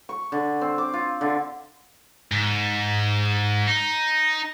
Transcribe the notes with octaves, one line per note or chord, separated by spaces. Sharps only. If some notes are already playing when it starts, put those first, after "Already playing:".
C#6
D3
C4
D6
F4
D3
G#2
D#4